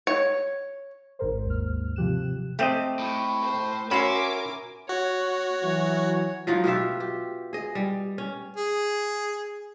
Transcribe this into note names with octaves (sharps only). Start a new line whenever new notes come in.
C#5
G#1 G#2 A#4 C5
D#2 G#2 F6
C3 F3 G4 F#6 E7
A3 C4 G4 D#5
A2
C5
C#4 F#4 A#4 E5 G#5 B5 C6 D6
F#4 C#5
E3 F#3
F3 F#3 D#4 F4
B2 F4 G4 E5
G4
G#4 D#5
G3
C#4
G#4